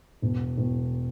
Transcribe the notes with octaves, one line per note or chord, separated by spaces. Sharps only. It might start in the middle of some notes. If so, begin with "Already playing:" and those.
E1
E1